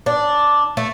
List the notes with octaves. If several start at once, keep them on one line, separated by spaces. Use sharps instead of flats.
D4
A3